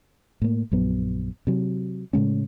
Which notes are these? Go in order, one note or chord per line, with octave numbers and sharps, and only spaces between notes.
A2 A#3
A#1 F#2 F#3 B3
C3 F#3
A2 C#3 G#3 C#4